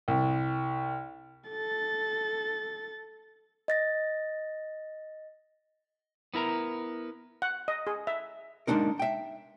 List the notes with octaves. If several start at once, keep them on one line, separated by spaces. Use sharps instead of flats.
C2
A4 A6
D#5 A6 A#6
B3 E4 A#4 A#5
F#5
D#5
G#4
E5
G#3 A#3 D4 D#4 A#4
E5 G5